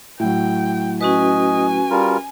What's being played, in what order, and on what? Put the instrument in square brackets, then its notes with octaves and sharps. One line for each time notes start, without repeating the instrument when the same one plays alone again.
[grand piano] A2 F#3 [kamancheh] G5
[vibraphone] C#4 F#4 B4 [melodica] D#5 [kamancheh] G#5
[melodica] G3 F4 A#4